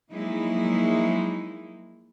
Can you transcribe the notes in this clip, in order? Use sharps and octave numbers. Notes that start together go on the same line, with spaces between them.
F3 F#3 G#3 A#3 D#4 E4